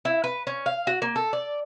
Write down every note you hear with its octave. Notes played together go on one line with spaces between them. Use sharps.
E4
B4
C#4
F5
F#4
A#3
A4
D5